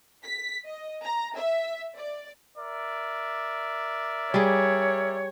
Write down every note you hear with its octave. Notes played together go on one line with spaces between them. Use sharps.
B6
D#5
A#5
E5
D5
A#4 D5 E5
G3 G#4 C#5